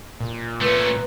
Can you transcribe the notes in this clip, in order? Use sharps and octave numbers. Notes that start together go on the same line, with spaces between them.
A#2
A3 C#4 B4